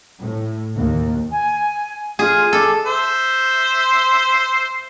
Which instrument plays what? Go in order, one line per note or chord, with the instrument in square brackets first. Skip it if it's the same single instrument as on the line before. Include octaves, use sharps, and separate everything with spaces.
[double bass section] A2
D#2
[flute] G#5
[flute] F4 [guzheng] G#4
[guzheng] A4 [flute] D6
[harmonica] C5 E5